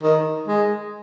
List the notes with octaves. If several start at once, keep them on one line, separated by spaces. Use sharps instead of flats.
D#3
G#3